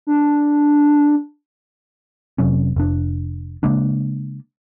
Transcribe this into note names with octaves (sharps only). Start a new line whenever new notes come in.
D4
F1 C3 F#3 C#4
F1 D4
C#3 G#3 A#3 D4